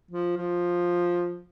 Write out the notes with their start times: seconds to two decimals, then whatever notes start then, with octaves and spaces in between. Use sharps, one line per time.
0.11 F3
0.37 F3